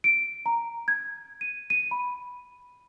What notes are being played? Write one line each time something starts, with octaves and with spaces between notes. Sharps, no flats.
D7
A#5
G#6
D#7
D#7
B5